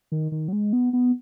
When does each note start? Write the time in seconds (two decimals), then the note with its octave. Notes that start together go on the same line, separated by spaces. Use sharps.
0.12 D#3
0.32 D#3
0.48 F#3
0.53 G#3
0.73 B3
0.93 B3